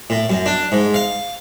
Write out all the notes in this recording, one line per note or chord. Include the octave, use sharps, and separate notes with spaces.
A2
F#2
D4
G#2
F5